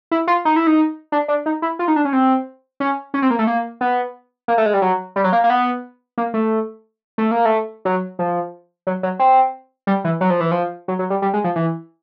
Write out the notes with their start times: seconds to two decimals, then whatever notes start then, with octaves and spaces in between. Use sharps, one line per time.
0.11 E4
0.28 F4
0.45 D#4
0.56 E4
0.67 D#4
1.12 D4
1.28 D4
1.46 D#4
1.62 E4
1.79 F4
1.88 D#4
1.96 D4
2.05 C#4
2.13 C4
2.80 C#4
3.14 C#4
3.22 C4
3.31 A#3
3.39 A3
3.47 A#3
3.81 B3
4.48 A#3
4.58 A3
4.66 G#3
4.74 G3
4.82 F#3
5.16 G3
5.24 F#3
5.33 A#3
5.44 A#3
5.50 B3
6.18 A#3
6.34 A3
7.18 A3
7.31 A#3
7.45 A3
7.85 F#3
8.19 F3
8.87 F#3
9.03 F#3
9.19 C4
9.87 G3
10.04 E3
10.21 F#3
10.30 F3
10.40 E3
10.51 F3
10.88 F#3
10.99 F#3
11.10 G3
11.22 G3
11.34 G#3
11.44 F3
11.56 E3